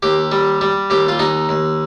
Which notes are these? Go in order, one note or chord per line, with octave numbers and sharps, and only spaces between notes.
D#2 G4
G3
G3
D#2 G4
F4
D#2 D#4
D#2